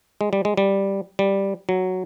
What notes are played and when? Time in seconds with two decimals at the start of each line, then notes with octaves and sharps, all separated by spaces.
0.21 G#3
0.33 G3
0.45 G#3
0.57 G3
1.19 G3
1.69 F#3